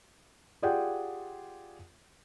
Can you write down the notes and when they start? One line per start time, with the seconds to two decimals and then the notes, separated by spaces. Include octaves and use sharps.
0.62 F4 G4 G#4 D5 F#5 G5